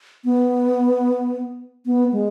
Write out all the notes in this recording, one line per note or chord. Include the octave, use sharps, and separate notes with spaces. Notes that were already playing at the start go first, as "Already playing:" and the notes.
B3
B3
G#3